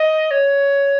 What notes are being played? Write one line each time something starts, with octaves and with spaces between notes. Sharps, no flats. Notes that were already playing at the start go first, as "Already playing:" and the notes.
Already playing: D#5
C#5